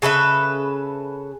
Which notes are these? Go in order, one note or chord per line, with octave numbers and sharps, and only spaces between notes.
C#3 A4 B4 E5